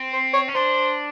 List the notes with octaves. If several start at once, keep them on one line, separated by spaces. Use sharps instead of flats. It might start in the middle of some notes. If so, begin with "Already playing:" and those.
Already playing: C4
C5
C#5
C#4
D4 C5